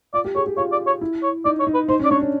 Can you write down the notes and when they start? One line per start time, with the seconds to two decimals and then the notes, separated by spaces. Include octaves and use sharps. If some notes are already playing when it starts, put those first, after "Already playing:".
0.14 F4 D5
0.25 G4
0.35 G#4 C#5
0.47 G4
0.57 F4 C#5
0.72 D5
0.87 C#5
1.01 E4
1.23 C#5
1.45 D#4 D5
1.60 C#5
1.67 D#4
1.74 B4
1.89 D#4 C5
2.00 C#4
2.05 D5
2.11 D4 C#5
2.21 C#4